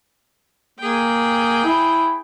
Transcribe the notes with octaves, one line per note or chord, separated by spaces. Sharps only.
A#3 G#4 G5
E4